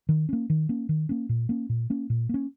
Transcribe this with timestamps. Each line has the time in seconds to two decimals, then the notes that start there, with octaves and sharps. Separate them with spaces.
0.09 D#3
0.29 A#3 C#4
0.50 D#3
0.69 A#3 C#4
0.89 D#3
1.09 A#3 C#4
1.29 A#2
1.49 A#3 C#4
1.69 A#2
1.90 A#3 C#4
2.10 A#2
2.29 A#3 C#4